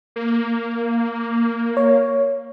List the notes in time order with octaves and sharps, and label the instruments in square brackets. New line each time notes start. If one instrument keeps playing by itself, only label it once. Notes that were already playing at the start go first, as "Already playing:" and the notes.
[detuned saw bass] A#3
[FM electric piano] C#5